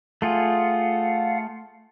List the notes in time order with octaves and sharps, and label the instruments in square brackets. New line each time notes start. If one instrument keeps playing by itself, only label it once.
[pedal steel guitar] A3 F4 G#4 [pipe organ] F5 F#5